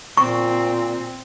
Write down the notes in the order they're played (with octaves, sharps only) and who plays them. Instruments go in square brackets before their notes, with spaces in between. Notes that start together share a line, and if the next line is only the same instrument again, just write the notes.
[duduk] A#2 [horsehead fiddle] C4 [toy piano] C#6